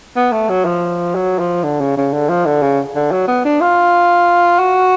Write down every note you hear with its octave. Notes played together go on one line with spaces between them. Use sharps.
B3
A3
F#3
F3
F#3
F3
D3
C#3
C#3
D3
F3
D3
C#3
D3
F#3
B3
D4
F4
F#4